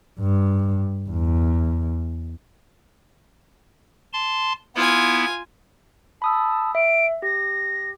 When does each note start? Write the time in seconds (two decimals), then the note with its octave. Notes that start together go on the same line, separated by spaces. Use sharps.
0.20 G2
1.10 E2
4.13 A5 C6
4.76 B3 E4 F4 G#5
6.22 A5 B5 D#6 E6
6.75 E5 D7
7.22 G4 A#6